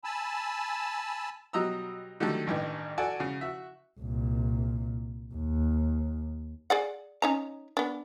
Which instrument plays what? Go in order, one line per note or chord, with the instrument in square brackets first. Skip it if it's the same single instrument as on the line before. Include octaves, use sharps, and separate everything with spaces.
[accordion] G#5 A5 B5 E6
[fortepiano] B2 F#3 G3 D#5 A#5 E6
D3 D#3 F#3 G3 A3
A1 G2 D#3
F#4 A4 D5 F#5 G#5
C#3 F#4
F#4 E5
[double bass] C2 A#2
D#2
[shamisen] G#4 D5 F#5
C#4 D#4 A#5
B3 D4